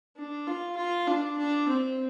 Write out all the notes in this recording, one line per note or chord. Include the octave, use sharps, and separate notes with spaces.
D4
F4
F4
D4
D4
C4